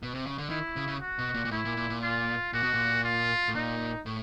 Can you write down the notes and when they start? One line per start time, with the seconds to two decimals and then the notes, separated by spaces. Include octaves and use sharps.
0.03 B2
0.15 C3
0.26 C#3
0.38 D3
0.49 D#3 E4
0.76 C#3
0.88 C#3
1.01 F#4
1.18 B2
1.34 A#2
1.45 A#2
1.51 A2 E4
1.65 A#2
1.77 A#2
1.90 A#2
2.03 F4
2.53 A#2 F#4
2.63 B2
2.74 A#2
3.04 F4
3.48 A2
3.55 A#2 D#4
4.06 A2